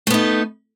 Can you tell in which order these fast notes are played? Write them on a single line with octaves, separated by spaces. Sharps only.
A3 B3 D#4